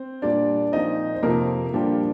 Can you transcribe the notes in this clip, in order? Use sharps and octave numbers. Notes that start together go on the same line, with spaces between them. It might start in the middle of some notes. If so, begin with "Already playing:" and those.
Already playing: C4 C5
A#2 G3 D4 D5
A#2 F3 C4 D#4 D#5
C5
F2 C3 F3 A#3 A#4
A#2 F3 G3 A#3 D4 G4